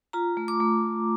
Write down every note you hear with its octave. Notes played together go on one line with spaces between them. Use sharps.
F4 A#5
A3
D6
A3